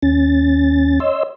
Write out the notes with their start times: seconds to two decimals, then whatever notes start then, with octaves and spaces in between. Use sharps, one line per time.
0.03 D#2 C#4 A6
1.00 C#5 D#5 C6 E6